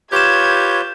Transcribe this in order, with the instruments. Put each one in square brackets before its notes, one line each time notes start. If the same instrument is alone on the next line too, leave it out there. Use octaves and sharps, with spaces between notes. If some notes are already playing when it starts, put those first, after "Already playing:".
[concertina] F4 B4 C#5 [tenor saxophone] G4 [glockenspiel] G6 E7 [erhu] G#6